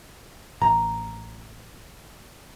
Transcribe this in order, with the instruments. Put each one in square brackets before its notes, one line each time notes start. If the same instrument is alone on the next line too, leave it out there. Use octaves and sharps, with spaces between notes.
[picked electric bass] A1 [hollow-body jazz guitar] A#5